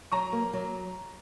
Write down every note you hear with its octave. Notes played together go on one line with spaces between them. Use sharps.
F#3 A#5 C#6
A#3
F#3